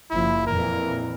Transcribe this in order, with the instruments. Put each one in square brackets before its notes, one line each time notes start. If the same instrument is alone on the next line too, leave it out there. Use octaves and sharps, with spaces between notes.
[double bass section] F#1 F3 [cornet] E4
[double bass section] F2 A#2 E3 [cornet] A#4